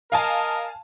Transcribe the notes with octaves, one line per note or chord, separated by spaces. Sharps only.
A#4 D#5 F5 G#5 A5